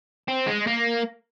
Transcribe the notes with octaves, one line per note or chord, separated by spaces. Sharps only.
C4
G#3
A#3